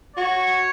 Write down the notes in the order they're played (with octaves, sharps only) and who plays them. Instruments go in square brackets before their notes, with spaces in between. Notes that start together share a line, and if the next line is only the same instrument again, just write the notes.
[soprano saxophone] F#4 [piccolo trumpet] C#5